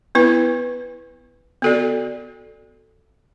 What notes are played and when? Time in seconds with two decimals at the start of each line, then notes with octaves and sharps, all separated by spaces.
0.15 B3 E4 B4
1.62 B3 F#4 A4 D5